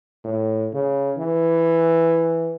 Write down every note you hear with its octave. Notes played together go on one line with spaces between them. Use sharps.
A2
C#3
E3